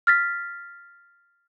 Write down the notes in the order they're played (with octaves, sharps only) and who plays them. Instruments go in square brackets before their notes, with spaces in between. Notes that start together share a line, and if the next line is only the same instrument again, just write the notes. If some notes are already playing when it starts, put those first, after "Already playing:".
[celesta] F6 A6 B6